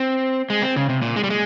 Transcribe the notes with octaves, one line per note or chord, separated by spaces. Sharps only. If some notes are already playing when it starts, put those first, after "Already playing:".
Already playing: C4
G#3
C4
C#3
C3
A#2
G#3
G3
G#3